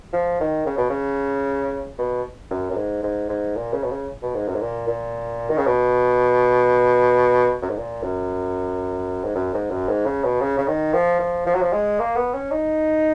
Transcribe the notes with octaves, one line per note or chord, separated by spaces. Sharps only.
F3
D#3
C#3
B2
C#3
B2
F#2
F#2
G#2
G#2
G#2
A#2
C#3
B2
C#3
B2
G#2
F#2
G#2
A#2
A#2
D#3
C#3
B2
F#2
G#2
A#2
F#2
G#2
F#2
G#2
F#2
G#2
C#3
B2
C#3
C#3
D#3
F3
F3
F3
F#3
F3
G#3
A#3
B3
C#4
D#4